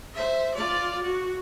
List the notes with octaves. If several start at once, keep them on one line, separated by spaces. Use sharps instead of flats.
C5 E5
F4 D5
F#4